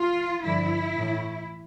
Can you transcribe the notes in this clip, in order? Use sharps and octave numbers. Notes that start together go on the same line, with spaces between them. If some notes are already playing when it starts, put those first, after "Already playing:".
Already playing: F4
G2 D3 F3 E4
A2 E3